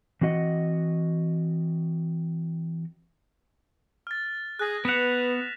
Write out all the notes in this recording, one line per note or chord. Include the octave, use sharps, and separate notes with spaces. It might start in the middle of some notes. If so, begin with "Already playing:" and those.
E3 C4 F#4 D#5 F#5
F6 A6
G#4 F#6 A#6
B3 B4 F#5 B6 E7 F7